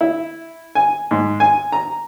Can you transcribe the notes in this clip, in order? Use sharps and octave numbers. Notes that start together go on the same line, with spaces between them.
E4
G#5
G#2
G#5
A#5